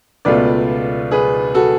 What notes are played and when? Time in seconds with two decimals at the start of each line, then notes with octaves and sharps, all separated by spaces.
0.25 C#2 B2 A3 F4 B4 D5
1.11 G#4 B4
1.55 F#4 A4